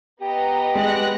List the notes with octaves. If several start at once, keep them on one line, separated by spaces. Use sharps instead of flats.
B3 G4 D#5 A#5
G#3 B3 F#6 A#6